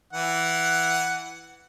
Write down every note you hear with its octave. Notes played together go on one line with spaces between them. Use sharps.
E3 F#5